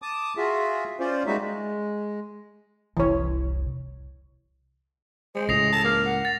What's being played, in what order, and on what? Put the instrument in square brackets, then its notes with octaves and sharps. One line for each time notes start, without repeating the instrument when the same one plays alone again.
[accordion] A5 D6 D#6
F4 F#4 G#4 E5
C#4 F4 C5 D5
G3 G#3 A#3 D#4 F#4 E5
G#3
[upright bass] F1 C2 [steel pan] E3 C#5
[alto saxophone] G#3 [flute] C5
[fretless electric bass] C#2 A2 [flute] D#6 [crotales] A#6 C7 F7
[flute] A4 [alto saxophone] A5
[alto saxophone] A#3 [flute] F6
[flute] F#5
[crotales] A6